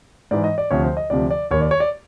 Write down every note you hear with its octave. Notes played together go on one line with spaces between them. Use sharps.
G#2 E3 D5
D#5
D5
D2 C3 F3 C#5
C5
D#5
D2 C3 F3 D5
D5
D#2 D#3 C#5
D5
C#5
D5